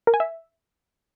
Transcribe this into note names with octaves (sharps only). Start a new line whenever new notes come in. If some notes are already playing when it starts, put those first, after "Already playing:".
A#4
G#5
E5